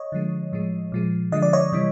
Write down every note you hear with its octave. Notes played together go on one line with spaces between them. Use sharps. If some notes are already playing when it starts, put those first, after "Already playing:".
Already playing: C#5 D#5
D3 F3 G#3
A2 F3 G#3
A#2 F3 G#3
D3 F3 G#3 D#5
D5
C#5 D#5
C3 E3 G3